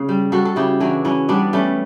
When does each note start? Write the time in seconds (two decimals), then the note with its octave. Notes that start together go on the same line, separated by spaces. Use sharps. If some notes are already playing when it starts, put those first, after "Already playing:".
Already playing: C#3
0.09 G3
0.32 G3 F#4 A4
0.45 A4
0.56 C#3 E4 G4
0.80 E3 D4 F#4
1.05 E3 C#4 E4
1.29 G3 B3 D4
1.53 G3 A3 C#4